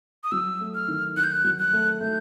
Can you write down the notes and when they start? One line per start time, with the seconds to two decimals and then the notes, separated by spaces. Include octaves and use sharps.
0.24 D#6
0.32 F#3 E6
0.61 A3
0.75 F6
0.88 D#3
1.16 D#3 F#6
1.24 G6
1.32 F#6
1.44 F#3
1.59 F#6
1.73 A3
2.01 A3 G6